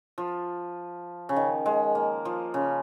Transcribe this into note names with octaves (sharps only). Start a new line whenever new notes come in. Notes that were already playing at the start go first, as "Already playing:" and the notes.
F3
C#3
D#3
G#3
A#3
F3
C#3